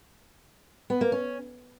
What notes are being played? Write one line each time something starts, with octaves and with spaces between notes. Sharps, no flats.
B3
A#3
C#4